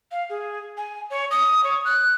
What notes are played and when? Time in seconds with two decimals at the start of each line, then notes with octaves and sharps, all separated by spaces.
0.12 F5
0.30 G#4
0.77 G#5
1.10 C#5
1.31 D#6
1.64 C#5
1.85 F#6